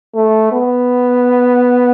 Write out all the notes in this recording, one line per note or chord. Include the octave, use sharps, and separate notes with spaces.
A3
B3